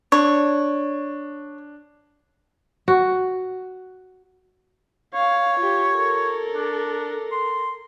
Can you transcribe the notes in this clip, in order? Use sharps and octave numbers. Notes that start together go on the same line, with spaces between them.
D4 C#5
F#4
C#5 F5
F4 G4
A4 A#4
D4
C6